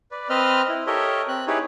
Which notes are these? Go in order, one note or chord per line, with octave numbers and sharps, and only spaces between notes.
B4 D5
C4 B4 C5 D#5 F6
E4
G4 A4 A#4 C#5 D#5 E5
C4 F#6
D#4 E4 G4 G#4 B4 C#5